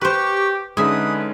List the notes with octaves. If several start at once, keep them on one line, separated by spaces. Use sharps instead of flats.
G4 B4 C5 C#6
D3 G#3 C#4 D#4 G#4 B4 E5 D#6